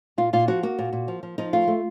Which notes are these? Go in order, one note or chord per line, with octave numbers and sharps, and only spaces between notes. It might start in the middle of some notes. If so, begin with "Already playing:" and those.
A#2 F4
A#2 F4
F3 F#4
A#3 F#4
A#2
A#2
F3
F3
F3 D#4
A3 F4
A3